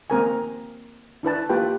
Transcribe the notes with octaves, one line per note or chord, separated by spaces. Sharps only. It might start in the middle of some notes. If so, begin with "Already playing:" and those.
A#3 C4 A#4 G#5
D4 E4 B4 A5
A#3 F4 G4 B4 G5